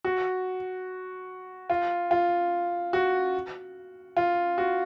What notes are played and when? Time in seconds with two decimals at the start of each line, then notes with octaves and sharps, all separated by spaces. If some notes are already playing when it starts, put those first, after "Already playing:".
0.05 F#4
1.70 F4
2.11 F4
2.93 F#4
4.17 F4
4.58 F#4